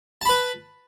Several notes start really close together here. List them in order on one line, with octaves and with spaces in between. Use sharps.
A5 B5 B4